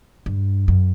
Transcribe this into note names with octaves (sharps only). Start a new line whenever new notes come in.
G2
F#2